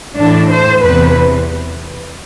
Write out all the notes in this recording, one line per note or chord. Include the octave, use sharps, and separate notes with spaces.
A2 E3 D4
C5
E2 C3 E3 B4